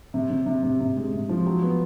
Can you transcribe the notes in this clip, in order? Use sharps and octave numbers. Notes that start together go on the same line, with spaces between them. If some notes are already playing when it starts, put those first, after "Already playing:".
C3
C3
C3
C3
C3
G#3
C3
F3
F#3
B3